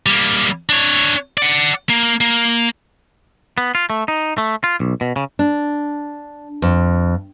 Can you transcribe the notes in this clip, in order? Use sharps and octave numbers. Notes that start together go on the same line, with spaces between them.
G3 A#3
D4 C#5
D5 F#5
A#3
A#3
B3
F4
A3
D#4
A3
F4
B1
B2
C#3
D4
F2